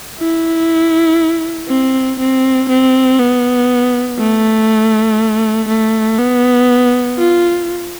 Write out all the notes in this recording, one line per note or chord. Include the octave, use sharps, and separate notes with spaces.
E4
C4
C4
C4
B3
A3
A3
B3
F4